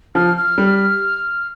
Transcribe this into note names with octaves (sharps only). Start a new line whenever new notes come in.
F3 F6
F6
G3